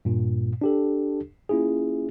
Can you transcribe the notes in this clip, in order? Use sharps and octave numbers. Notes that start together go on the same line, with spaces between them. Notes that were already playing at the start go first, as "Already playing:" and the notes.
G2 A#2
D4 G4 A4
A#3 C#4 E4 F4 G#4